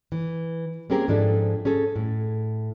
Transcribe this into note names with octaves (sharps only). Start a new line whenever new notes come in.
E3
A#3 C4 C#4 G4 G#4 A#4
G#2 F3 D4 E4 A4
C#4 G#4 A4
A2